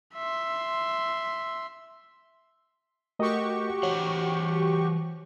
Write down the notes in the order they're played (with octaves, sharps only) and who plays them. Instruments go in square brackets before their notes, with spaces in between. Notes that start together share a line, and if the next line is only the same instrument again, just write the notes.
[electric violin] E5 C6
[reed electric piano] A3 A#4 D#5 [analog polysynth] F#4 G4 C#6
[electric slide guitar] E3 C5 F#5 [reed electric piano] C#5